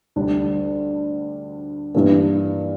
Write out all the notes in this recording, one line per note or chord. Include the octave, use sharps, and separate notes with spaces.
D2 D3 G3 D4
G2 E3 G3 A#3 D4